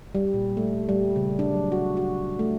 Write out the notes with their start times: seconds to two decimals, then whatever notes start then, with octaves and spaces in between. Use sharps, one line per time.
0.15 G3
0.34 A#2
0.57 A3
0.89 G3
1.16 C#3
1.39 D4
1.53 F#3
1.72 F#4
1.97 F#4
2.39 A3